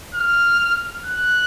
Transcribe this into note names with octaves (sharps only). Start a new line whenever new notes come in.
F6
F#6